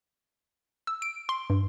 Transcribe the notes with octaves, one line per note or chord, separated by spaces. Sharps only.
E6
D7
C6
G2